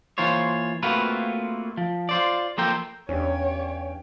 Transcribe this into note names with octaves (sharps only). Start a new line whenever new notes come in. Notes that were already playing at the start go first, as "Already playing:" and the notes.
E3 A#3 F4 C5 C#5
A3 A#3 C4 F4 F#4 B4
F3
F4 C5 D5
F3 A#3 A4 A#4 C5 G5
E2 C#4 D4 G4 C#5 F5 G5 G#5